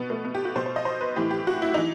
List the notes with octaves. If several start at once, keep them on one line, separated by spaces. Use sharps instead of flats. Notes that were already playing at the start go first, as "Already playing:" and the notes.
Already playing: B2 B3
A3
B3
G4
F#4
B2 C5
C5
D#5
C5
B4
A2 E3 G4
G4
F#4
E4
E3 D#4